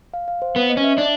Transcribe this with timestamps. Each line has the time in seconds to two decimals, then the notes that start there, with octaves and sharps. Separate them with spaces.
0.14 F5
0.28 F5
0.42 C5
0.56 B3 B4
0.70 D#5
0.77 C#4
0.84 E5
0.98 D4